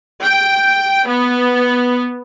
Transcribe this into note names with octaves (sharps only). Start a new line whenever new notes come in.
G5
B3